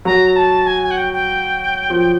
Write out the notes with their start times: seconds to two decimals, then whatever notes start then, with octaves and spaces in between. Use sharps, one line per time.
0.05 F#3 A#5
0.36 A5
0.67 G#5
0.83 G#5
0.91 F#5
0.97 G5
1.13 G5
1.90 F3